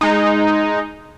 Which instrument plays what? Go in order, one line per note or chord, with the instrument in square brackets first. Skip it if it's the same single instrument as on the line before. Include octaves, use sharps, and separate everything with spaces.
[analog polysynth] G#3 D#4